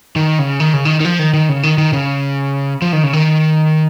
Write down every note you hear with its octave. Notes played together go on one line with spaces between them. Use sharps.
D#3
C#3
D#3
C#3
D#3
D#3
F3
D#3
D#3
C#3
D#3
D#3
C#3
F3
D#3
C#3
D#3